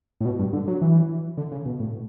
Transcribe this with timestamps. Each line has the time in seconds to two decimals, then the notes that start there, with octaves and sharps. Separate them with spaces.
0.21 A2
0.25 B2
0.39 G2
0.53 D3
0.68 F#3
0.81 E3
1.37 D3
1.52 C#3
1.65 B2
1.80 A2